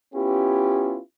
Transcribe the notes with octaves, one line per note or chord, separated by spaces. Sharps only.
B3 C#4 E4 F4 G4